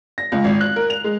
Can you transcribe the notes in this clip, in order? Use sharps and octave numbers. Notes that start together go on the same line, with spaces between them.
A#6
C#2
G#1
F#6
A#4
F7
G#3